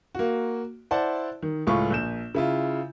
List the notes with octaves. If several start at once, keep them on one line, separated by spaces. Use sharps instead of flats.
A#3 F#4
E4 C5 D5 F#5 A5
D#3
C#2 A2 F4 C#6
A#1 G6 E7
C#3 E4 F4